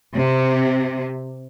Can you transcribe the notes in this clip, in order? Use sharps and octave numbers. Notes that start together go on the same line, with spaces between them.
C3